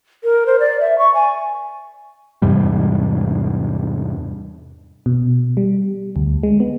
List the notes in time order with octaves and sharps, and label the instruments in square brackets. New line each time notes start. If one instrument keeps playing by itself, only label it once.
[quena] A#4
C5
D5
E5
C#6
G#5
[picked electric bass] E2 G#2 C3 G3
[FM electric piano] B2
G3
D2
G#3
B3